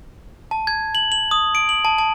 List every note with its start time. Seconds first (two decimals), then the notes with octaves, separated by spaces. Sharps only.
0.51 A5
0.67 G#6
0.95 F#7
1.12 F#7
1.31 D#6
1.55 D7
1.69 F#7
1.85 A5
1.98 A5